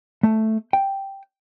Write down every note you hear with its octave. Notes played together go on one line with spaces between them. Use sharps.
A3
G5